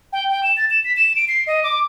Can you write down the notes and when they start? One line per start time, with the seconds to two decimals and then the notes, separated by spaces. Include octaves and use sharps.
0.13 G5
0.30 G5
0.43 E7
0.57 A6
0.70 E7
0.85 B6
0.97 E7
1.16 D7
1.28 C7
1.47 D#5
1.63 D6